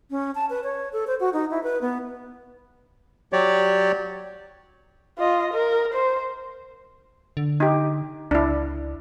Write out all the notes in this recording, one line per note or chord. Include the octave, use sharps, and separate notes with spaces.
C#4
A5
B4
C#5
A4
C5
F#4
D#4
E4
B4
B3
F#3 G4 C#5 D5
F4 D#5
A#4
C5
D3
D#4 G4
C#2 D4 E4